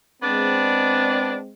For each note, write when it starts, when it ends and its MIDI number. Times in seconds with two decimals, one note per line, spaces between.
0.23 1.54 56
0.23 1.36 59
0.23 1.54 60
0.23 1.36 62